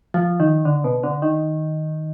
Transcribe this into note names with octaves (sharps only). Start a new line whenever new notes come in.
F3
D#3
D3
B2
D3
D#3